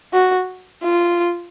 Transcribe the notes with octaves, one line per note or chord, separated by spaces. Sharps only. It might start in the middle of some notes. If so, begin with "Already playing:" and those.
F#4
F4